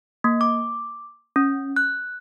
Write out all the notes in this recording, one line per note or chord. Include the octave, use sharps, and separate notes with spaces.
A#3
D6
C#4
F#6